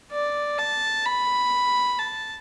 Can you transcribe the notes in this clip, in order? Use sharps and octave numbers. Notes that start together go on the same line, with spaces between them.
D5
A5
B5
A5